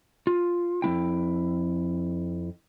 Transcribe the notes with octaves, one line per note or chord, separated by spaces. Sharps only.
F4
F2 A#3 E4 G5